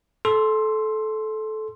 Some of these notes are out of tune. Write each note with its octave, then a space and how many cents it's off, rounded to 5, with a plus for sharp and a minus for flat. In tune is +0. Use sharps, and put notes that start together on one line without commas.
A4 -20 C6 +5 E6 +20